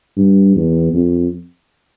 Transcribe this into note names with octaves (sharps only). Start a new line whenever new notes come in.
G2
E2
F2